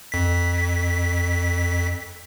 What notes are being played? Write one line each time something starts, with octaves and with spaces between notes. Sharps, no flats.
F2 B6